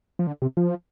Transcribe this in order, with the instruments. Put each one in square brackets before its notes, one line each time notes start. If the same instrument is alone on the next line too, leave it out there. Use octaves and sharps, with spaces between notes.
[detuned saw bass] F3
D3
C3
F3